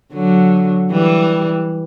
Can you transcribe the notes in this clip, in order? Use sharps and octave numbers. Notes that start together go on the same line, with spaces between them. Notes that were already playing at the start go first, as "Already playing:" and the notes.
D3 F#3
E3 G3